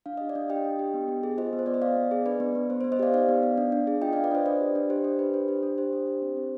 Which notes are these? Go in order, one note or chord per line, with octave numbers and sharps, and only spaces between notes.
D4 F5
G4 D#5
D5 F5
D4
G4 D#5 G5
D4
G4
B3
B3
G#4
F4 C5 D#5
B3
C5
B3 D5
D#5
B3 D5 F5
B3
G#4
D4 B4 D5
B3
B3
B3 C5
C5
B3
C5 D#5
G4 D5 F5
D#4 D5 F5
B3
B3
D4
D4
G#4
F4 D#5 G5
D4 D5 F5
B4 D5
D4 C5 D#5
D4 B4 D5
G4
D4
G4 C5
D4
G4 B4
D4 C5
G4
D4
G4 C5
D4
G4
C4
C4